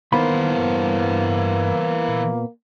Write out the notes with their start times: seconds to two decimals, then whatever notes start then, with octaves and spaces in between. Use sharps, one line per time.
0.13 D#3 E3 A#3 B3 C5 B5
0.59 G2
2.08 A#2